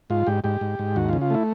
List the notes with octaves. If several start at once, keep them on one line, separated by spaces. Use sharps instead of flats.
G#2 F4
G#2 G4
G#2 G4
G#2
G#2
D#2 F#4
F4
C#3
F4
A3 E4